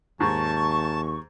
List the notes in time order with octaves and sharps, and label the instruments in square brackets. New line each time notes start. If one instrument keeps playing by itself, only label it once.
[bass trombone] D#2 [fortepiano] G#2 [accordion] A5 [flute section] C#6